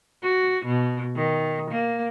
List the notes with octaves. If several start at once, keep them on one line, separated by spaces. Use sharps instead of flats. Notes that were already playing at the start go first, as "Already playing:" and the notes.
F#4
B2
D#3
A#3